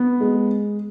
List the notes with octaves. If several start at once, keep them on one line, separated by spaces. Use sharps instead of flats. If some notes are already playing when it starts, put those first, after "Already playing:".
Already playing: B3
G#3